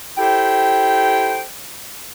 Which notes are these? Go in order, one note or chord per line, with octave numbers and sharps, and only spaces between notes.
E4 G4 A4 C5 G5